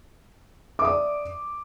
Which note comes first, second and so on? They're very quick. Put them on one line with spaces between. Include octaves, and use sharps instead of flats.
D6 E5 D#6 D5